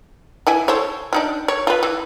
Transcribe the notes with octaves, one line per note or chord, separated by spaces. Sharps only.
E3 E4 G#5
A4 C5 C#5
D4 D#4 F4
C#5
F4 B4
E3